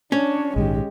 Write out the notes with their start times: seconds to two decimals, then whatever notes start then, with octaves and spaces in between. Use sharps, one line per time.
0.12 C#4 D4 C#5
0.56 A#1 G#2 D#3 G#3 G4